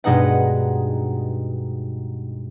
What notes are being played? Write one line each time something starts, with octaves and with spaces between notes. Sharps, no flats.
G2 B2 G#3 D#4 B4 F#5